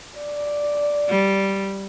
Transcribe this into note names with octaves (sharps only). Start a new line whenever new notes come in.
D5
G3